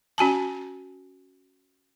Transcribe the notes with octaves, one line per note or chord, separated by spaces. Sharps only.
C#4 F#4 G#5 A5